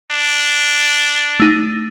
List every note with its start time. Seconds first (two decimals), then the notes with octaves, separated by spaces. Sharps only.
0.11 D4
1.40 A3 D#4